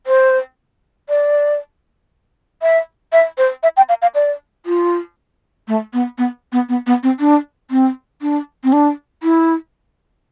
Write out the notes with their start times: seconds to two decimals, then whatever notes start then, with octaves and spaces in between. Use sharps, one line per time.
0.07 C5
1.09 D5
2.62 E5
3.13 E5
3.38 C5
3.63 E5
3.77 G5
3.89 F5
4.02 F5
4.15 D5
4.66 F4
5.68 A3
5.93 B3
6.18 B3
6.52 B3
6.69 B3
6.87 B3
7.03 C4
7.20 D4
7.71 C4
8.22 D4
8.64 C4
8.73 D4
9.23 E4